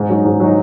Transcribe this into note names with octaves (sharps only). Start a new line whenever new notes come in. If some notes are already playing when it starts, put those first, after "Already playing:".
Already playing: G#2
F#3 D#4
G#2
F#3 D#4